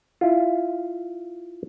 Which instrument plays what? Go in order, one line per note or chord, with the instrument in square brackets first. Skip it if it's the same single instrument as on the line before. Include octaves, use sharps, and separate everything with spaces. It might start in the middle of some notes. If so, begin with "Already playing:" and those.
[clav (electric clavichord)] E4 F4